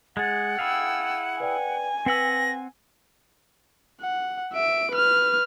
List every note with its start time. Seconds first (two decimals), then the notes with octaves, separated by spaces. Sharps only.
0.17 G#3 G#4 F#5 G#6 A6
0.59 E4 G#4 F5 G5 E6
1.40 B4 D5 G5 G#5
2.06 C4 B4 F#5 E6 A#6 B6 F#7
4.01 F#5
4.53 E5 D7
4.91 B4 F6